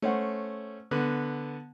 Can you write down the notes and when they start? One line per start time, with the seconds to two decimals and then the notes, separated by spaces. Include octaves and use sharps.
0.02 A3 C#4 C5 F#5
0.91 D3 B3